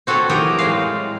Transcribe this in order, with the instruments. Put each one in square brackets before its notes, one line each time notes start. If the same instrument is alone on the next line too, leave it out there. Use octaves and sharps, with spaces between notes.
[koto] C4 F#4 A4 B4 C#5
E3 F#3 G4 A#4 D#5
A2 F#3 G#3 F5